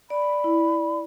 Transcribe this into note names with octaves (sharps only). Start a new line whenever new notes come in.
D5 B5
E4